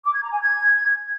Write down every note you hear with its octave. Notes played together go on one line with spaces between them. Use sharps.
D6
G#6
A#5
G#5
G#6